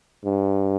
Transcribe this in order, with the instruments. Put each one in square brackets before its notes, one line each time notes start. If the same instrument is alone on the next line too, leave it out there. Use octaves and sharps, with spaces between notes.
[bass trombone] G2